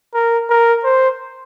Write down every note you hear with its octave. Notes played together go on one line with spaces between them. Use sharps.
A#4
A#4
C5